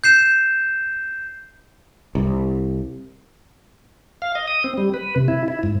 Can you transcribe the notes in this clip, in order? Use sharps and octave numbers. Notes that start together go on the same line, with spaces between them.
G6 C7 E7
C2
F5
D#5
D#6
C4
G3
B4
C3
E4
E4
G#2